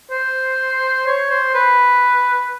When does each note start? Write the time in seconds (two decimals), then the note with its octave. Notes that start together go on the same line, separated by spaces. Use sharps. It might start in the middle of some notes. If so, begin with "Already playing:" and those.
0.11 C5
1.07 C#5
1.30 C5
1.55 B4